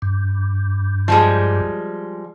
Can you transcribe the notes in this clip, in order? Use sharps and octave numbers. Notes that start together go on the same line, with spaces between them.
G2
F3 G3 G#3